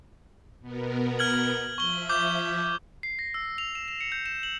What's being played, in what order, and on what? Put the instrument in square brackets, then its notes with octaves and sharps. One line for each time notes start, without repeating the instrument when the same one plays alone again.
[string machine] B2 B3 A#4
[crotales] F6 G#6 F#7
[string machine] F3 E5 [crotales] C#6 G7
[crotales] D6 G6
C7
A#6
E6
F7
E7
E7
C#7
G6
E7
F#7